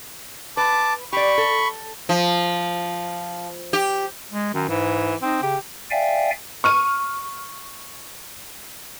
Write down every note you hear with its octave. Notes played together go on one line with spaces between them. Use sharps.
B4 A5 D6
G4 D5 B5 C#6
A4
F3
G4
G#3
F#2 D#3
G#2 E3
C4 D#4
C#3 G4
D5 E5 F5 G5 G#5
C#6 F6 D#7